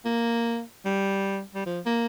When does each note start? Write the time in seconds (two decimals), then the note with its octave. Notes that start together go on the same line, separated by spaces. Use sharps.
0.05 A#3
0.85 G3
1.55 G3
1.66 F3
1.86 A#3